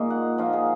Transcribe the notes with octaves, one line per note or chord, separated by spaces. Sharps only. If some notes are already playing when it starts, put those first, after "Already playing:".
Already playing: A#2 G#3 D#4 D#5
F#5
F3 A#3 D#4 F5
G#4